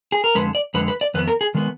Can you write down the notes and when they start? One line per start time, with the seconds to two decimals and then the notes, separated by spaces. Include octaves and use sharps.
0.12 G#4
0.24 A#4
0.35 F2 D3 G#3 B4
0.55 D5
0.74 F2 D3 G#3 B4
0.88 B4
1.01 D5
1.14 F2 D#3 B3 B4
1.28 A#4
1.41 G#4
1.55 D#3 G#3 B3